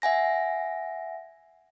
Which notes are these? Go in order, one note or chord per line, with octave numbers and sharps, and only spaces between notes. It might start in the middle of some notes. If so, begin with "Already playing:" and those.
E5 F#5 G#5 A#6